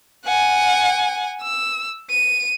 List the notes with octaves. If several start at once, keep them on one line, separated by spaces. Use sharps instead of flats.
F#5 G#5
E6
D#7